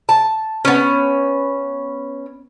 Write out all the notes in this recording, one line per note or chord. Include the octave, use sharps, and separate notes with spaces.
A5
B3 C#4